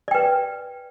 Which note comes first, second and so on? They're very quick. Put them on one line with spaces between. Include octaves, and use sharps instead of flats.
D5 G5 B4